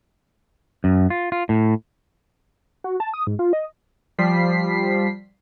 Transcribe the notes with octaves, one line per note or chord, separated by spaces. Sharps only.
F#2
F4
F4
A2
F#4
A5
D#6
G#2
F4
D#5
F3 G3 B6 C7